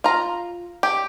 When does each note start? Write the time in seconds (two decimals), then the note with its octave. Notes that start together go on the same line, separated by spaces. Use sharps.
0.04 F4 A#5
0.83 G4